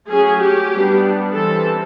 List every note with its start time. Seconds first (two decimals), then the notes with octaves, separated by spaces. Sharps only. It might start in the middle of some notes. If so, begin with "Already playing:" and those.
0.09 F#3 A3 C#4 G#4
0.41 G4
0.71 G3 B3 D4
1.33 E3 G3 C4 A4